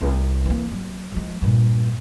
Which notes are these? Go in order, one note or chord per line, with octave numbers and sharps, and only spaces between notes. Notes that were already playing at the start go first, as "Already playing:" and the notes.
C2
E3 A#3
F#3
F3 G#3
G2 A#2